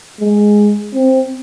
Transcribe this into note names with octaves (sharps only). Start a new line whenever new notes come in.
G#3
C4